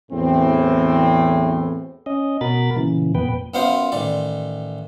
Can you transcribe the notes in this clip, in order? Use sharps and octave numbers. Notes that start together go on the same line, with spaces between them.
E2 A2 E3 F#3 C4
C#4 D#5
B2 F#4 A#4 B5 A6
A#2 C#3 E3
F2 A#2 B3 B4 G5
F#2 B3 F4 C5
A1 D#3 D5